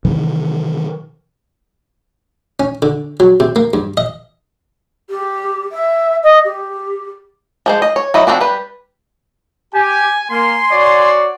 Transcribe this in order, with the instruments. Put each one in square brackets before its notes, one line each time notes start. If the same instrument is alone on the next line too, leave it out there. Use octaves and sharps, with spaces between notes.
[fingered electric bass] C3 D#3 E3
[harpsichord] C#4
D3
F#3
C3
A#3
G2
D#5
[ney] G4
E5
D#5
G4
[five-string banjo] F3 G#3 C5
D#5
C#5
F#3 E4 D#5
F3 C4 D4 F#4
G3 B4
[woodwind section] G4 [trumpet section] G#5
[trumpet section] A#3 [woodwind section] G#5 C6
[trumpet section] F#4 C#5 D5